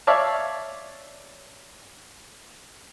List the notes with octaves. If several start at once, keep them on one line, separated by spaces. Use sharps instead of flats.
C#5 D5 E5 F5 A5